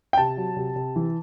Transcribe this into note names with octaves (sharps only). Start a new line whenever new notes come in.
G5
C3 A5
F#3
C3
C3
E3